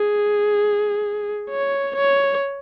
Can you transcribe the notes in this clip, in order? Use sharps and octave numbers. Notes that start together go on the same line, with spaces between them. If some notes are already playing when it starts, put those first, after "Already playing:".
Already playing: G#4
C#5
C#5